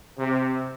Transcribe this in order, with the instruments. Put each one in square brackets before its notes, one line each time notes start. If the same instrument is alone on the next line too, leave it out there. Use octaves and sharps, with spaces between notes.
[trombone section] C3